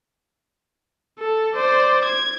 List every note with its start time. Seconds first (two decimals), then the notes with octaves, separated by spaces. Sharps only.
1.19 A4
1.55 C5 D5
2.05 G#6